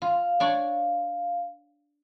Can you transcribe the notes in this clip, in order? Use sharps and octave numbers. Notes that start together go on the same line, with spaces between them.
F4 F5
D4 C#5 D5